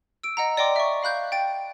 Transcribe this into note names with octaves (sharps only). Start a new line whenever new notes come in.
E6 D7
D#5 F#5 A#5
D5 D#5 G5 C6 D6
E5 C#6
F5 B5 F#6 G6
G5 A6 D7